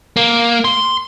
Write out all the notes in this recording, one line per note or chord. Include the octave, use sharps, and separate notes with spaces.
A#3
C6